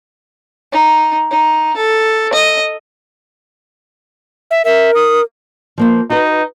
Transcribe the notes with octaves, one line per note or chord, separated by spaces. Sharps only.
D#4
D#4
A4
D#5
E5
A#4 E5
D#6
F3 A#3 C5
D#4 F#4 B4